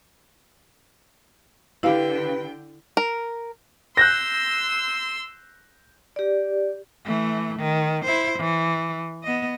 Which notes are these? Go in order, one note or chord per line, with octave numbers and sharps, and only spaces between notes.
D3 E4 G4 B4 F5 G5
A#4
C6 E6 F#6 G6 A#6
G4 D5
E3 A3
D#3
E4 C5
E3
B3 D#5